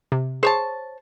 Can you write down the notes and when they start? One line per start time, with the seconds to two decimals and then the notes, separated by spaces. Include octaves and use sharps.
0.12 C3
0.43 G#4 C5 C#5 A5